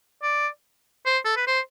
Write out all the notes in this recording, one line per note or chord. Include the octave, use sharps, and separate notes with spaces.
D5
C5
A4
B4
C5